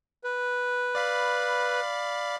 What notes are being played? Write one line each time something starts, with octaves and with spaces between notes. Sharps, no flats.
B4
D5 F5 B5